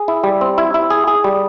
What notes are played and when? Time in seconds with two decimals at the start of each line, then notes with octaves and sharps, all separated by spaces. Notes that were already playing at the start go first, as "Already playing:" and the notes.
Already playing: G#4
0.08 E4
0.24 G3
0.41 C4
0.58 E4
0.74 E4
0.90 G#4
1.07 G#4
1.24 G3